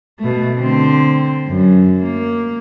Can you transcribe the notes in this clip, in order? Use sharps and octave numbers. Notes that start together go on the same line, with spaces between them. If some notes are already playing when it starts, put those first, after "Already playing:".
B2 A3
D3 C4
F#2
A#3